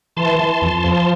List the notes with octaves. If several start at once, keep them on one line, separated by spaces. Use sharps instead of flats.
E3 A5 C6
E3
F2
F3